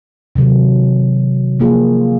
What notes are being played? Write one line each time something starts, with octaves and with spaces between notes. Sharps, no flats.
C3 D#3 F#3
F3 A#3 F4 G#4